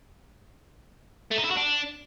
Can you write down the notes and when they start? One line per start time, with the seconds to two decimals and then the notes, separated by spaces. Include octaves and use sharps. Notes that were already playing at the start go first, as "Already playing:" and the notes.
1.31 A3
1.37 D#4
1.44 E4
1.50 F#4
1.56 D4